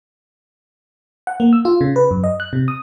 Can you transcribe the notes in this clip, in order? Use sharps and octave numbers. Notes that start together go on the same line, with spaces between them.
F#5
A#3
E6
F4
C#3
B4
F#2
D#5
F#6
C3
D#6